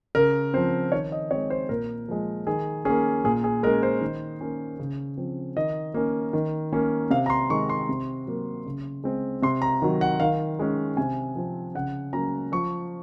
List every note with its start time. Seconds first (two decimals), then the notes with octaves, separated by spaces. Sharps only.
0.15 C#3 A#4
0.54 F3 C4 C5
0.92 D#3 C#5
1.12 D#5
1.31 G#3 C4 C#5
1.50 C5
1.69 A#2 A#4
2.08 F3 G#3
2.47 D#3 G#4
2.85 A#3 C#4 G#4
3.24 A#2 G#4
3.44 G#4
3.63 G#3 A#4
3.67 C#4
3.83 C5
4.01 D#3
4.41 A#3 C#4
4.79 C#3
5.18 F3 C4
5.57 D#3 D#5
5.94 A#3 C#4
6.33 D#3
6.72 A#3 C#4
7.10 C3 F5
7.26 A#5
7.30 C6
7.50 D#3 G#3 C#6
7.69 C6
7.89 C3
8.27 F#3 A#3
8.66 C#3
9.04 G#3 C4
9.42 C3 C6
9.62 A#5
9.82 D#3 F#3
10.01 F#5
10.20 D#3 F5
10.59 G#3 C#4
10.97 C3 G#5
11.36 F3 C4
11.75 C#3 F#5
12.13 F#3 A#3 C#4 A#5
12.52 F3 C#6